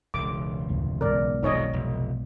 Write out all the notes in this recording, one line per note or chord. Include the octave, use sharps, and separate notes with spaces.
E1 C#2 D6
F1 D2 A2
B1 G#2 B2 A#4 D5
D#1 F2 C3 D#4 C#5 D#5
F1